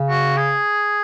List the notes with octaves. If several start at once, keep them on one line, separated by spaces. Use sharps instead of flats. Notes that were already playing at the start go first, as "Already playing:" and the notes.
Already playing: C#3
F#4
G#4